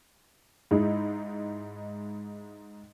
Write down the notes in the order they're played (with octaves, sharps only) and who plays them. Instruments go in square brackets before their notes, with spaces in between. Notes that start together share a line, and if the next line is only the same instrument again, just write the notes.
[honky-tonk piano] G#2 G#3 D#4 E4